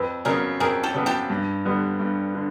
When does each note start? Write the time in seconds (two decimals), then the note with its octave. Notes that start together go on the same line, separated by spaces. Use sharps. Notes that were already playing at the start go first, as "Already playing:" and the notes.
Already playing: F2 B4
0.25 C#3 F#3 B3 G#4 A#4
0.60 F2 G#4 A#4
0.83 G4 A4
0.94 C#3 F#3 B3
1.06 G4 A4
1.30 G2
1.65 D3 G3 B3
2.00 G2
2.35 D3